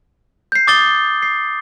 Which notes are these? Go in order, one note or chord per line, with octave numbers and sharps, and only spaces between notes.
G6 C7
D6 D#6 A6 C7 G7
C7